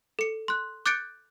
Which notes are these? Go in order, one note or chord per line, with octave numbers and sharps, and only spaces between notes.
A4 C#7
C6 F#6
D6 F#6 G6 A6 C#7 D7